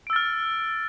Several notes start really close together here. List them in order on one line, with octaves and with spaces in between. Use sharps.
D7 E6 A6 F6